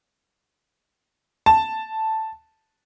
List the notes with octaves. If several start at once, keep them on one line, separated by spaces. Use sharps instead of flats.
A5